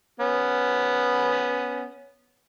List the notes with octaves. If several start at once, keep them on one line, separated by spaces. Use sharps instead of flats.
B3 C#4